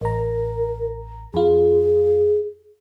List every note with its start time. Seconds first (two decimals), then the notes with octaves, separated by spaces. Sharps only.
0.01 A1 A#4 A#5
1.34 F2 F4 G#4